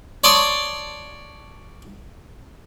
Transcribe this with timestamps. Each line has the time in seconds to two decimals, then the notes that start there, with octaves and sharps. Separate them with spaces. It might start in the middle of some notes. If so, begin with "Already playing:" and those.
0.24 C#5 D5 A5 C6 D#6